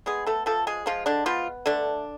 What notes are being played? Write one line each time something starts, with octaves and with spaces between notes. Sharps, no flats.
G#3 B3 G#4
A3 A4
F3 A3 A4
G#3 G#4
F3 G#3 F4
D3 D4
F3 B3 F4
D3 A3 D4